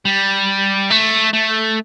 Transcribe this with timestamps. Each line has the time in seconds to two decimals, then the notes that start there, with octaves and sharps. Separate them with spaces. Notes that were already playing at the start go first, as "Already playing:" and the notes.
0.05 G3
0.91 A3
1.33 A3